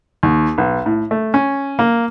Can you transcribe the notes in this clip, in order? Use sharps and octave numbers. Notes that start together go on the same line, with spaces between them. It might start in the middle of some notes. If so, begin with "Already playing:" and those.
D#2
B1
A2
A3
C#4
A#3